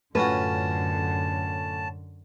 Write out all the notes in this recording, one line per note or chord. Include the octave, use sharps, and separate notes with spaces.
F#2 A2 D3 C#4 F4 F#4 B4 A5